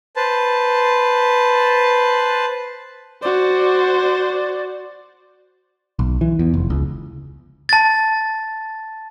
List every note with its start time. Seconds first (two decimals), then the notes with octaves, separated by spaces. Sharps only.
0.16 B4 C5 A5
3.22 F#4 C5 D5
5.99 B1
6.21 E3
6.39 E2
6.54 F1
6.70 C#2
7.69 A5 A6